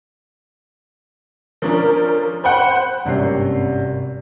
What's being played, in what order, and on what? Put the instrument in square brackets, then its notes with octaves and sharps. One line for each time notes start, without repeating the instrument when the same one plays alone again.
[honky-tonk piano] F3 C#4 D4 [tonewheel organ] A#4
[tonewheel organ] C5 [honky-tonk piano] F#5 G5 B5
[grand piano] G#1 G2 C3 A#3 C#4 C7